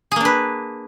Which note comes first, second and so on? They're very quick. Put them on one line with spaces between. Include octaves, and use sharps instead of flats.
G#4 A#3 D4 B4